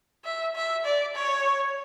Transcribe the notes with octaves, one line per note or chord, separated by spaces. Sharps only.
E5
E5
D5
C#5